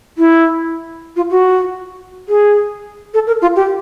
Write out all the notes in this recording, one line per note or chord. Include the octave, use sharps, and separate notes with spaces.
E4
F4
F#4
G#4
A4
A#4
F4
G4